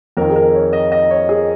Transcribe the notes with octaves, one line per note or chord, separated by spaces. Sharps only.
F2 D#3 A#4
G#4
A#4
C#5
D#5
D#5
C#5
G#4